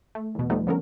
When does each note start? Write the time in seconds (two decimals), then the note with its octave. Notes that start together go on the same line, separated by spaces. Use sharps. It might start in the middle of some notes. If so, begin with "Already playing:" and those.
0.15 A3
0.35 E2 B2
0.50 F3 G3 A3 B3 D#4
0.67 D3 F3 B3 C#4 A4 A#4